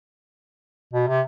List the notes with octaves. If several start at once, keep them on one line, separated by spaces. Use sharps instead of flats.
B2
C3